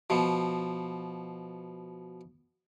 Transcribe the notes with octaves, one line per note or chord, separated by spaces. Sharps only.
B2 F3